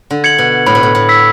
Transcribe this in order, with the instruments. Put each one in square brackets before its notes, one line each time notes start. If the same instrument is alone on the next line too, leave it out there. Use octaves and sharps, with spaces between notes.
[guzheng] D3
[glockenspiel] G#6 C#7 F#7
[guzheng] B2
[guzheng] A2 [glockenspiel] B5
[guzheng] B2
A2
A2
[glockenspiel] E6 B6